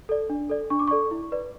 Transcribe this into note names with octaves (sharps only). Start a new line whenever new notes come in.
A4 D5
D4
A4 D5
D4 C#6
D6
A4 D5 C#6
E4
B4 D5